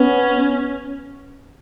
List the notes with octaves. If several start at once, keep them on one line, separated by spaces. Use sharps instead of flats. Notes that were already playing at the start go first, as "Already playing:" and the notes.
Already playing: B3 C#4